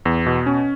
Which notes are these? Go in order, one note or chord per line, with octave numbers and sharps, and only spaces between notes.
E2
B2
C#4